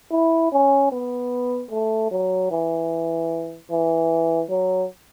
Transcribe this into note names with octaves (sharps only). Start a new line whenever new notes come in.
E4
C#4
B3
A3
F#3
E3
E3
F#3